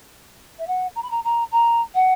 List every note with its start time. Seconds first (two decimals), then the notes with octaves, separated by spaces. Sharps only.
0.58 E5
0.67 F#5
0.95 A#5
1.02 B5
1.11 A#5
1.24 A#5
1.51 A#5
1.94 F#5